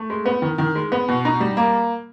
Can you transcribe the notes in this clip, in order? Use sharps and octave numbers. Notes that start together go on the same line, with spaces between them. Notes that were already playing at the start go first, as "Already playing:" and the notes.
Already playing: A3
G#3
B3
D#3
D#3
G#3
B3
B2
D#4
G3
A#3